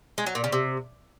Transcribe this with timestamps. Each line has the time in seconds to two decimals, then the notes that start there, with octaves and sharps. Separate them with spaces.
0.18 G#3
0.26 F#3
0.35 A#2
0.44 C#3
0.52 C3